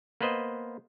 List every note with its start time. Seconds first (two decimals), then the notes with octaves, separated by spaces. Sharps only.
0.21 A#3 B3 B4 C5 D#5